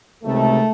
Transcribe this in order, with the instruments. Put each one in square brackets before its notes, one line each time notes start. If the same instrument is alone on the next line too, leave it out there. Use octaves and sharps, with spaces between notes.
[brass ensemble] C#2 C3 D#3 A3